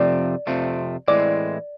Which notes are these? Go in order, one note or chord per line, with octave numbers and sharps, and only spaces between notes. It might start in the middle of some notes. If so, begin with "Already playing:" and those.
Already playing: F2 C3 F3 A3 C4 D5
F2 C3 F3 A3 C4
A2 E3 G#3 C4 D5